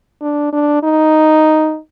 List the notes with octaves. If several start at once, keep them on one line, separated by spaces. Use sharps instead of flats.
D4
D4
D#4